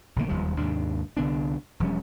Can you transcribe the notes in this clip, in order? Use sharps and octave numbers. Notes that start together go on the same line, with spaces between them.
A#1 D3 D#3 A#3
E1 D#2 F3 G3
D#2 G#2 C3 D4
C2 D3 B3 D4
E1 F3 G3 C#4